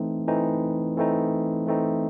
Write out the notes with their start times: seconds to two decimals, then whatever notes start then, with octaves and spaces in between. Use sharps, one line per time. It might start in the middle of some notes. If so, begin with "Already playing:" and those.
Already playing: E3 A3 C4 D#4
0.28 E3 A3 C4 D#4
0.97 E3 A3 C4 D#4
1.67 E3 A3 C4 D#4